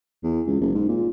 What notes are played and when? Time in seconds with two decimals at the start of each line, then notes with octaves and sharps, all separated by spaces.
0.23 E2
0.47 C#2
0.61 F#1
0.75 G#2
0.88 A#2